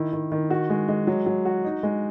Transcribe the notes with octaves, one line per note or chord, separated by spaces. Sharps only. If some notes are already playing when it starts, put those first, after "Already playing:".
Already playing: D#3 E4
D#3
D#3
F#4
G#3
G#3
F#3
F#3
F#4
D#4
G#3